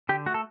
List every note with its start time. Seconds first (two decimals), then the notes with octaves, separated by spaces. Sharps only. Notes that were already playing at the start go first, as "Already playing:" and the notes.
0.09 D3 G4
0.26 A3 F#4
0.34 A4